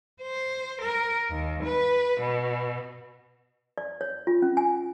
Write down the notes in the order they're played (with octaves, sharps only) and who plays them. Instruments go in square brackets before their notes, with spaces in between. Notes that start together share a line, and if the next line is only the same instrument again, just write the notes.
[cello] C5
A#4
D#2
B4
B2
[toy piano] D5
C#5
F4
C#4
G#5